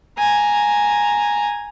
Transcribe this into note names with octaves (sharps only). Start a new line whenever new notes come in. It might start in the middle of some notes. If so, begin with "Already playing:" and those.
G#5 A#5